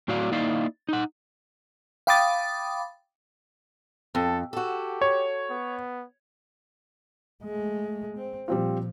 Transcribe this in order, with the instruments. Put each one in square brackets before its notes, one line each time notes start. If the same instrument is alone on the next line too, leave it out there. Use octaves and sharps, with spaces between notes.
[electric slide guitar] A2 F#3 F#4 D5 F5
A#3 D#4 E4 D5 F5
D#4 F#5
[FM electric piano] F5 G5 B5 D6 D#6 A6
[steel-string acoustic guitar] F2 [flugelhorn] A4
[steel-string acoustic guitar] F#4 A4 [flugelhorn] G4
[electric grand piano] C#5
[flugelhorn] B3
[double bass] G#3 A3
C4
[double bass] A#2 F3 [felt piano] G3 C4 F4